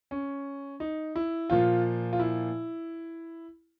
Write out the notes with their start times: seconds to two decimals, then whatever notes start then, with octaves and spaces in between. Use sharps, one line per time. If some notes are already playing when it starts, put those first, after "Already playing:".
0.11 C#4
0.80 D#4
1.16 E4
1.50 A#2 F3 F4
2.13 F4
2.20 E4